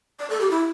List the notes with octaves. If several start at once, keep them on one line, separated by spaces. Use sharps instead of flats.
D5
A4
G4
E4